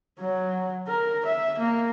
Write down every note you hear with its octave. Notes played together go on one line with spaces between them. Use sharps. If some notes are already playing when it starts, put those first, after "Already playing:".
F#3
A#4
E5
A#3